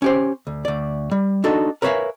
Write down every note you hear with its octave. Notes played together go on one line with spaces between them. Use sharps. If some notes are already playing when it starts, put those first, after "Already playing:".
C#4 G4 C5
D2
D2 D5
G3
D4 D#4 F#4 A4
A#4 B4 C#5 E5 F5 G#5